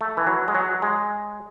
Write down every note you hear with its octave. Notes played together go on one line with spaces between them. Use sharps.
A3
E3
F#3
G#3
F#3
G#3